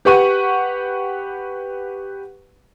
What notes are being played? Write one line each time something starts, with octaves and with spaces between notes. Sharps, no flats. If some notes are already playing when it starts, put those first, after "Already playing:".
G4 B4 F#5 C#6 D#7